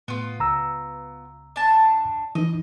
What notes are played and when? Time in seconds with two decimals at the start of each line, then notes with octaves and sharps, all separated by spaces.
0.08 A2 B3 F4
0.40 C#2 A#5 E6
1.56 D4 A5
2.35 E3 D#4 D#5